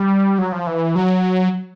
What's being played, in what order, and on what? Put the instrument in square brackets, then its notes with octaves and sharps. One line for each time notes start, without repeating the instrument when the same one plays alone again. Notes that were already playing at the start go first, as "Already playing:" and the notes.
Already playing: [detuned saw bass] G3
F#3
F3
E3
F#3